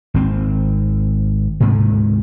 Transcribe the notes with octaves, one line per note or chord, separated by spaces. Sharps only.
G#1 C4
D2 G#2 C3